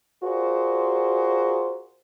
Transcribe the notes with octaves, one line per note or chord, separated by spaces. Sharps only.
F4 F#4 G#4 A#4 C5 D5